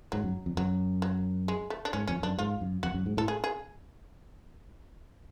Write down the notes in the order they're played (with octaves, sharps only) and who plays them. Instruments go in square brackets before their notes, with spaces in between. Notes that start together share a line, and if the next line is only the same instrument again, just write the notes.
[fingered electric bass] G#2 [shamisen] F#3
[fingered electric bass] F#2
F2
[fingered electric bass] F#2 [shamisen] F#3
[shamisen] F#3
G#3
A3
D4
[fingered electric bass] G#2 [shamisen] C#4
[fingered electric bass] F2 [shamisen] C#4
[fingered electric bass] F#2 [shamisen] D4
[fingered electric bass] G#2 [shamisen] F4
[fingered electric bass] F#2
[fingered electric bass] F2 [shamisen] F#4
[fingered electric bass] F#2
G#2
[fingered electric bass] A2 [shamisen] A4
[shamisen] G#4
G#4